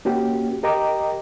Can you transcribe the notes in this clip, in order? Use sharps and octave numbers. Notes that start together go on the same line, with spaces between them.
A#3 C#4 F#4 G4
G4 A#4 D#5 G5 A#5 D6